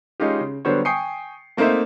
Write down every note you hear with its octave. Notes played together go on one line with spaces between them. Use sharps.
G#3 C#4 D#4 F4 G4
C#3
D3 F#3 G3 B3 C5 C#5
G5 G#5 C#6 D#6 C7 C#7
A3 A#3 C4 D#4 C5 E5